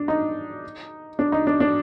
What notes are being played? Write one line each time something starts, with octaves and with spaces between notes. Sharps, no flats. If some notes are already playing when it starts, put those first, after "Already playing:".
Already playing: D4
D#4
D4
D#4
D4
D4